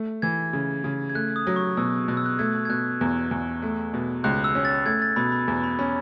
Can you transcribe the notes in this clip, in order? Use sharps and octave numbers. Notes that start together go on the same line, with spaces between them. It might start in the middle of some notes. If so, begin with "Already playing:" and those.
Already playing: A3
E3 G#6
C#3
C#3
G#6
A3 F#6
D#6
F#3
C#6
B2 E6
B2 F#6
E6
F#6
A3 G#6
G#6
B2 F#6
E2
E2
A3
B2
C#2 F#6
E6
C#4
A6
A3 G#6
A6
B2 B5
B5
E2
B5
C#4 B5